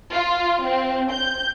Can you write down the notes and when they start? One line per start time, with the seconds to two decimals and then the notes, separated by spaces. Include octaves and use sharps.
0.12 F4
0.65 C4
1.12 G6